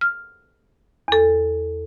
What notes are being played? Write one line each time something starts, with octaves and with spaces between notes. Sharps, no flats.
F6
E2 A4